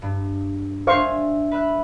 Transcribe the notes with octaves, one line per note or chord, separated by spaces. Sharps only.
G2
D4 C5 E5 F5 G#5 C#6
B4 E5 F#6